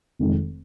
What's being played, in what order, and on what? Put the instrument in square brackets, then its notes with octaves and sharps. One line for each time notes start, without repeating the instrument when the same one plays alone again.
[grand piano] F1 F2 D#3 G#3